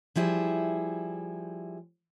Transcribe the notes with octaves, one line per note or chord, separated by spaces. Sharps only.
F3 G3 E4 G#4